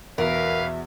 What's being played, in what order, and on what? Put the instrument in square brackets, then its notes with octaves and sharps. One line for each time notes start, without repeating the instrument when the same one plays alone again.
[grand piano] E2 B2 [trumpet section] C#4 B4 F5 [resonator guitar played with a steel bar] A#4 [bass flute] E5